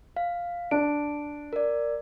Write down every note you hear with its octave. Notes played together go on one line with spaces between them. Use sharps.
F5
D4 D7
A#4 D5